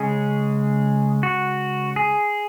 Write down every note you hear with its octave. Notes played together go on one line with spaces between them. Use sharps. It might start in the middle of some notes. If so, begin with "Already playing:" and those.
Already playing: C#3 G#3 C#4 G#4
F#4
G#4